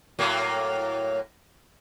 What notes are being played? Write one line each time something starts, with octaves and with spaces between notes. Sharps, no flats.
A2 F#3 A#3